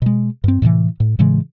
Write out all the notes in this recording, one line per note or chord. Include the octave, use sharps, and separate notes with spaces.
B2 G#3
G2 C4
A2 C3 D#3 E3
A2
A2 C#3 E3 G#3